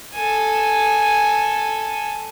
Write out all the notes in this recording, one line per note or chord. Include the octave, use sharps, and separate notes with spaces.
A4 G#5